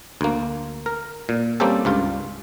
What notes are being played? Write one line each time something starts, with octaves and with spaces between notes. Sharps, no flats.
D2 A#3
A#4
A#2
G3 A#3 C4 C#4 G4 A4
C#2 G2 F4